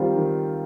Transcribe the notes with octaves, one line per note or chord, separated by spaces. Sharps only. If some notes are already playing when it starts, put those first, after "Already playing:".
Already playing: D#3 G3 C4 F4
D#3